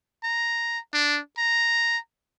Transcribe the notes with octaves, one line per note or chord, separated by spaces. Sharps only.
A#5
D4
A#5